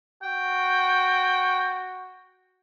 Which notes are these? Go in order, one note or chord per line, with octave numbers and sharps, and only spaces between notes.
F#4 G5